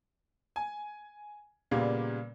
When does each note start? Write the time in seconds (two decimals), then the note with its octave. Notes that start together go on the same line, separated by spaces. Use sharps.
0.56 G#5
1.71 A#2 C#3 G3 A#3 B3